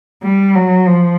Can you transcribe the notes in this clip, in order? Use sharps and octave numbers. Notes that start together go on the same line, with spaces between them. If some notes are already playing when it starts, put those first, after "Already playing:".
G3
F#3
F3